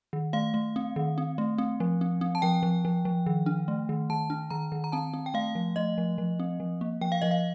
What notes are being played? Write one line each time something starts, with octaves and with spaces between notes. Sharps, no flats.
D#3
A3 F5
A3
C4
D#3
C4
A3
C4
F3
C4
C4
A5
F3 G5
F3
F3
F3
D#3
D4
A3
D#3
D#3 A5
D4
D#3 A#5
D#3
A#5
C4 A5
C4
G5
A3 F5
F3
A3 D#5
F3
F3
C4
F3
A#3
F3 G5
F5
F3 D#5
F5